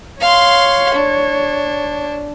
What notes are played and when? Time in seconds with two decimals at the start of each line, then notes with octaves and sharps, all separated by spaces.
0.21 C#5 F5 C6
0.94 D4